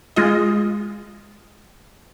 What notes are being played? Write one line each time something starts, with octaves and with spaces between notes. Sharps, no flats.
G#3 F4 D#5